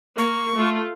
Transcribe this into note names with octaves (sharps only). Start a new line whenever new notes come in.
A#3 C#6
A3 F4